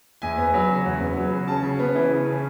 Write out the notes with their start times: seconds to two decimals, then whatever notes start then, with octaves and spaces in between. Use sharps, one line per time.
0.22 E2 G#5
0.38 B3
0.54 F#3
0.69 C#3
0.86 E2
1.00 B3
1.17 F#3
1.32 C#3
1.48 C#3 A5
1.63 C#3
1.79 B3
1.95 E3
2.10 C#3
2.26 C#3